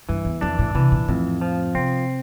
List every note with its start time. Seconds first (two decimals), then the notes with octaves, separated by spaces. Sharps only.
0.09 G2 E3
0.25 E2
0.41 F2 D4
0.59 A2
0.75 C3 E3
0.92 A#2
1.08 F2 A2
1.41 F3
1.74 C3 C4